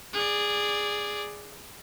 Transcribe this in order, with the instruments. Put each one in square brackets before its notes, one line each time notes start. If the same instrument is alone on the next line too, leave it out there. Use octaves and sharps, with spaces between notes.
[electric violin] G#4 D5